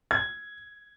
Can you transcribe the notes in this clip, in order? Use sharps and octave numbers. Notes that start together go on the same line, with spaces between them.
G#6